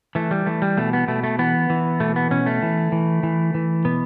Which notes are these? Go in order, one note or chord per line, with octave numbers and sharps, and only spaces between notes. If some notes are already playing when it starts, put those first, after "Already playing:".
E3 A3
G3
E3 A3
G3
B2 A3
B3
B2 A3
A3
E3 B3
E3
B2 A3
B3
B2 C#4
A3
E3
E3
E3
E3
B2 B3